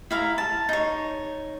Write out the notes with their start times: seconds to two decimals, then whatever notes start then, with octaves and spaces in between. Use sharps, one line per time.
0.11 E4 F5 A#5
0.38 A5
0.69 D#4 C#5